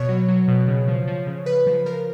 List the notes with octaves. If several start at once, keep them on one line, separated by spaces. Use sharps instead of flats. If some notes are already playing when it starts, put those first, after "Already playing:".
Already playing: B2 C#5
F#3
F#3
B2
C#3
F3
F3
C#3
C#3 B4
F3
F3 A#4